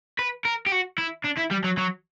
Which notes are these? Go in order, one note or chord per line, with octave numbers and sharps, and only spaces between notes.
B4
A#4
G4
F#4
E4
D4
E4
G3
F#3
F#3